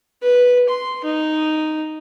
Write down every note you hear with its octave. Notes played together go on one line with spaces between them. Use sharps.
B4
C6
D#4